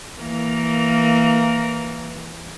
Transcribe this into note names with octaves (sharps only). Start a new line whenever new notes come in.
E3 A#3 A#4